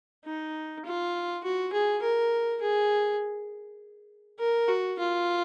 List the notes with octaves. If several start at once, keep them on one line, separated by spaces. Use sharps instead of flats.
D#4
F4
F#4
G#4
A#4
G#4
A#4
F#4
F4